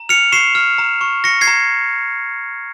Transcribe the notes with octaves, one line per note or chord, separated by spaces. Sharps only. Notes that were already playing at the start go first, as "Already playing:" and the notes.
Already playing: A#5
F6 C#7 F7
C#6 C7 E7
F6
A#5
C#6
C#6 A#6 C#7
G#6 C7
A#5